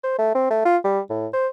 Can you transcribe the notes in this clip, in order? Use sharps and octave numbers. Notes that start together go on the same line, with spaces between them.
C5
A3
C4
A3
F4
G3
A2
C5